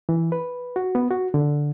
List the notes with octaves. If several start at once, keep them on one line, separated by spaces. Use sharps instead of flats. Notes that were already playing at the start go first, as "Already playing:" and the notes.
E3
B4
F#4
B3
F#4
D3